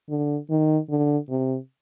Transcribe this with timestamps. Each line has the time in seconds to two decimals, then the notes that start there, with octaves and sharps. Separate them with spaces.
0.09 D3
0.50 D#3
0.90 D3
1.30 C3